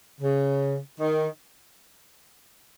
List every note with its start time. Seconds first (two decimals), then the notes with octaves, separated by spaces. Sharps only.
0.21 C#3
1.00 D#3